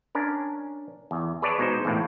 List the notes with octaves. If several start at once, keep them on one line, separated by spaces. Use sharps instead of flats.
C#4 D4 A#4
E2
G#4 B4 C#5 D5 A5
B2 G#3 D#4 C5
E2 A2 A#3